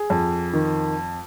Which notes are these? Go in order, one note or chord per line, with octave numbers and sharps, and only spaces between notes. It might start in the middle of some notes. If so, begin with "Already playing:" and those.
Already playing: G#4
F2
D#3